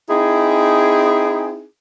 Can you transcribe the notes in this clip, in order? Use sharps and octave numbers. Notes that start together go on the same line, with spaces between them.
C4 D#4 E4 G#4